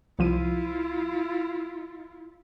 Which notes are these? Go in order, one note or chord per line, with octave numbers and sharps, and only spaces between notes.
C2 F3 E4 F4 D#7